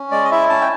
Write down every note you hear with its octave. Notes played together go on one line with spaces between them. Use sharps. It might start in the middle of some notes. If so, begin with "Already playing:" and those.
Already playing: C#4
G#3 D5
D#5
E4 E5
C#4 A5
G5